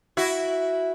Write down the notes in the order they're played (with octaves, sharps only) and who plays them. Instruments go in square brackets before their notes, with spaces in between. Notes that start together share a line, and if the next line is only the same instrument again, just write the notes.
[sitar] E4 F#4